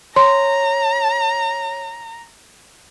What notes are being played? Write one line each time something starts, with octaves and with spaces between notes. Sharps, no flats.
C#5 A#5 C6